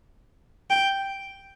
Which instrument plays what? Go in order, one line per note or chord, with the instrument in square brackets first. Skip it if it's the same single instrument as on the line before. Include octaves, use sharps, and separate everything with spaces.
[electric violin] G5